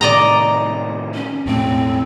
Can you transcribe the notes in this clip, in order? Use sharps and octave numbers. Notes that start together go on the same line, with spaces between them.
A2 C3 D#3 D5 D#5 A#5
C#4
E1 A2 A3 C4